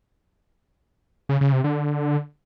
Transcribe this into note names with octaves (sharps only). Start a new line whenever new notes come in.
C#3
C#3
C3
D3